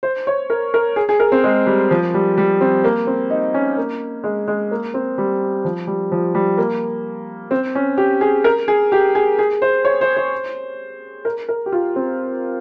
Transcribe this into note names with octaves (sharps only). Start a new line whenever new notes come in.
C5
C#5
A#4
A#4
G#4
G#4
A#4
C4
G#3
G3
F3
G3
G3
C4
A#3
C4
D#4
C#4
A#3
G#3
G#3
A#3
C4
G3
F3
G3
F3
G3
A#3
C4
C#4
G4
G#4
A#4
G#4
G4
G#4
G#4
C5
C#5
C5
C5
A#4
A#4
G4
F4
C4